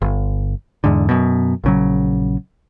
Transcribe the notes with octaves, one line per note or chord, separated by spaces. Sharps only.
G1
E2 G#2 D3
F#2 B2
A#1 C#3 F#3